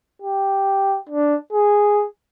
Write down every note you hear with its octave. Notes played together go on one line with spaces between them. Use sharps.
G4
D4
G#4